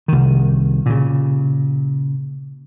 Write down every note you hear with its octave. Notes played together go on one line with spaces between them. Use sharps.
C2 D#3
A#2 C#3